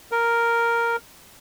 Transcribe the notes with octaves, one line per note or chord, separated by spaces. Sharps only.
A#4